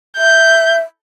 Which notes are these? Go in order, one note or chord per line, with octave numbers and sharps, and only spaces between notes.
E5 G6